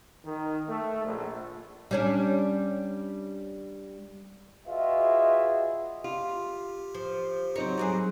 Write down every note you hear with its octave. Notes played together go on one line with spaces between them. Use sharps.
D#3
A3
A#1
G3 C#4 D4
F4 F#4 G#4 B4 D#5 E5
F4 G4
F3
F#3 C4 D#4 A#4 C#5
G3 F#4 G#4